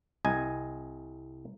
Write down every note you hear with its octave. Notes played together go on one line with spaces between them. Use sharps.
C2 D#5 G#5